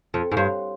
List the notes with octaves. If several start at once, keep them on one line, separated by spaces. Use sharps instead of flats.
F2
G#2
G2 G4 C#5 F5 C6